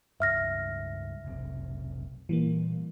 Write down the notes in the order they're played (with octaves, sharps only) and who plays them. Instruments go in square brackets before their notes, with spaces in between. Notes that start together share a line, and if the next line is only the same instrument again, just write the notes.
[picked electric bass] C#2 G2 [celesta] E5 F6 A#6
[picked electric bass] F1 B1 C3
[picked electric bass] A#2 [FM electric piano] E3 G3 A#3